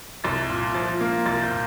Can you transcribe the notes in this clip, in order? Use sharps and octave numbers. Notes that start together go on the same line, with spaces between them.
C2 A6
A#2
F3 A6
A#3
C2 A6
G6
A#2